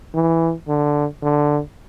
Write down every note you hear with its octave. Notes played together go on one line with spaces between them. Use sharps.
E3
D3
D3